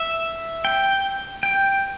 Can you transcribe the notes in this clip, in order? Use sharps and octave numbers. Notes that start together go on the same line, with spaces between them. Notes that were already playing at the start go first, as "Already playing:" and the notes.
Already playing: E5
G5
G5